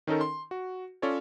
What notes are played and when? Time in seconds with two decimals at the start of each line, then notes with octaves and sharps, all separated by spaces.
0.07 D#3 C#4 D#4 A4 A#4
0.21 C6
0.51 F#4
1.02 C#4 F4 A4 C#5 D5